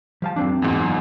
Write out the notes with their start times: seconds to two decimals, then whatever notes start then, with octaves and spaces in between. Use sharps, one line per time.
0.22 F3 F5 A5
0.36 F#2 C4 D4
0.62 E2 G#2
0.80 F3